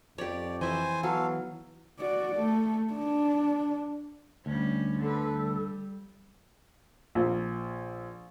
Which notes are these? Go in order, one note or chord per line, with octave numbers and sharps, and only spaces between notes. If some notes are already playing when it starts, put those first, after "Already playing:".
F2 G4 C#5 D5
E3 C5 D#5 E5 G#5
F#3 B3 A4 F5
F#4 D5
A3
D4
D2 G3 C#4
D3 A4 B4
G3
A#1